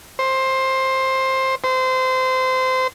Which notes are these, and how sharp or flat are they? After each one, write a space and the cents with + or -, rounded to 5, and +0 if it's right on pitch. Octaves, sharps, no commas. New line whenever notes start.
C5 +15
C5 -20